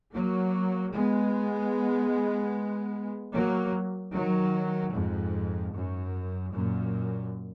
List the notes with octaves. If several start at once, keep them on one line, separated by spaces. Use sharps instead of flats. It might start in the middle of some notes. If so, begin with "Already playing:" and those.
F#3 A#3
G#3 B3
F#3 A#3
D#3 F#3
F2 G#2
F#2
F#2 A#2